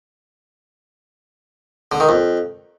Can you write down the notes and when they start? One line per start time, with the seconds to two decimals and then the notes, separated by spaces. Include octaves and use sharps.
1.92 D3
2.00 D#3
2.09 F2